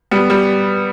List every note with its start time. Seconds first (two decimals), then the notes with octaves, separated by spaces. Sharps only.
0.11 G3 B3
0.30 G3